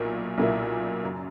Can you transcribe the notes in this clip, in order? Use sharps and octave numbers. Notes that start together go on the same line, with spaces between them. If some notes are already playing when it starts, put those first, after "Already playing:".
Already playing: B1 A#2 A#3 E4
B1 A#2 A#3 E4
F#2 C#3